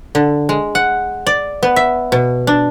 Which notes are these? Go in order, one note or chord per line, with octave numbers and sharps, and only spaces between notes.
D3
G#3
F#5
D5
B3
E5
B2
D4